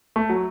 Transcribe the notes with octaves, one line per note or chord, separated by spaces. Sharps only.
A3
F#3